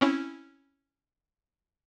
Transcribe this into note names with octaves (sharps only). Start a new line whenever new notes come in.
C4 C#4 E4